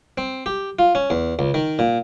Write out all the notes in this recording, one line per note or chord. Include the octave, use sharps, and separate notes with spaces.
C4
G4
F4
C#4
E2
C#2
D#3
A#2